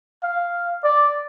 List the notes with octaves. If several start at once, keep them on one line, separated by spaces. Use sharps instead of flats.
F5
D5